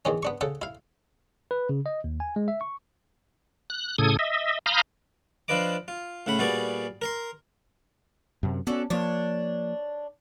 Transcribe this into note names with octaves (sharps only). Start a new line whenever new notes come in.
E2 D#3 C#4
B3 D4 C#6
C#3 A4 F#5
E4 F5
B4
C#3
D#5
D#2
G#5
G#3
E5
C#6
F#6
A2 C#3 A4 D#6 G#6
D#5 E5
F5 A#5 B5 D#6 F6 G6
F3 D4 F4 B4 D#5 D6
F4
A2 C#3 F#5 B5
A#2 G3 B3 F#4 G#4 D5
A#4 A#5 C6
F#2 C3
B3 C#4 F#4 A4 D5
F3 A#3 D4 C#5